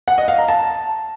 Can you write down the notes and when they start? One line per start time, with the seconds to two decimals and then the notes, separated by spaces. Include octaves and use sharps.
0.08 F#5
0.18 D#5
0.28 F5
0.38 A#5
0.48 A5